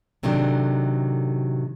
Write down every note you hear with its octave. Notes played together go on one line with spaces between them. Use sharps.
A2 C3 D#3 F#3 A3 D4